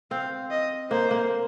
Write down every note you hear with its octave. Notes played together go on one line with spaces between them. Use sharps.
C4 F5
D#5
A#3 C5
A#3